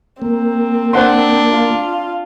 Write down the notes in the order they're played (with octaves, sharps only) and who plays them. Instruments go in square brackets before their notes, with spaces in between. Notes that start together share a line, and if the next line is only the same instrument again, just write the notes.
[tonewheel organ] A#3 [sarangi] C4
[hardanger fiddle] D4 [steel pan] C5 F#5 C6
[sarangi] F4